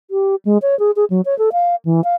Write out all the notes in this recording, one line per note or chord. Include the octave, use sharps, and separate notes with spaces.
G4
G#3
C#5
G#4
G#4
F#3
C#5
A4
F5
E3
F5